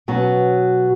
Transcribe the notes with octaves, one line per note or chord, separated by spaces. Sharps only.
B2 F#3 C#4 F#4